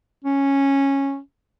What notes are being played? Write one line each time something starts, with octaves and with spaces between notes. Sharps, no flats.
C#4